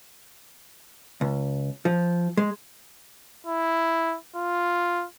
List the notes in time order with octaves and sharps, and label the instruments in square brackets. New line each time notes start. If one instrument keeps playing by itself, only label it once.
[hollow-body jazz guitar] C#2
F3
G#3
[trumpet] E4
F4